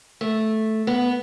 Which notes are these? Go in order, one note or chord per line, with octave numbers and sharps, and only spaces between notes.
A3
B3